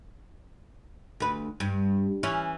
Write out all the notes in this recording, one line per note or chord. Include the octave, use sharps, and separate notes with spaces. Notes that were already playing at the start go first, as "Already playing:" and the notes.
D2 B4
G2
E3 C#4